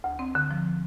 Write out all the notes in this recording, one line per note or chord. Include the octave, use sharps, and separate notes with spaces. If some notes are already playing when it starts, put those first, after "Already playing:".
D2
C4
D3
F3